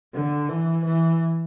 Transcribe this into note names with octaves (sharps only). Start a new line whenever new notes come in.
D3
E3
E3